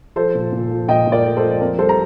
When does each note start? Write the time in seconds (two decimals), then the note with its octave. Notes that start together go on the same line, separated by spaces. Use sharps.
0.16 F3 A4 C5
0.35 A#2
0.52 A#2
0.71 F3
0.88 A#2 D#5 G5
1.07 A#2
1.12 A#4 D5
1.24 A3
1.37 A4 C5
1.43 F3
1.61 F2 A#4
1.79 G3 A4 C5
1.89 A#5